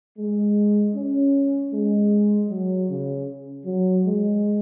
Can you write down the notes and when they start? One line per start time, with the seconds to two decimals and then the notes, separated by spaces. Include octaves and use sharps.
0.18 G#3
0.95 C#4
1.72 G#3
2.49 F#3
2.89 C#3
3.65 F#3
4.04 G#3